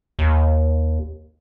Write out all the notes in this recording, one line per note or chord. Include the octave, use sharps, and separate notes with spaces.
D#2